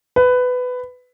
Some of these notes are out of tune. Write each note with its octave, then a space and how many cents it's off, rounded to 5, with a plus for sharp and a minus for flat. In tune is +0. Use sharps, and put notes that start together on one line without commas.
B4 +15